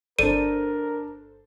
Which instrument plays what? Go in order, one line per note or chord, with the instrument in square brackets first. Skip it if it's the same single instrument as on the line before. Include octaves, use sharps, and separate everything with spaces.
[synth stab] G1 A4 C5 [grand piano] D4 D5 [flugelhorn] A#4 [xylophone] D#7